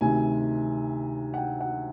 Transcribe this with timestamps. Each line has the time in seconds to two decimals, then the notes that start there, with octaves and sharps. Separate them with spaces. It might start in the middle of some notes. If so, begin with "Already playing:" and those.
0.01 D2 C3 D#3 G#5
1.34 F#5
1.37 G5
1.61 F#5